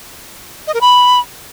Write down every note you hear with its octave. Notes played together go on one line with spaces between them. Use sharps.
D#5
A#4
B5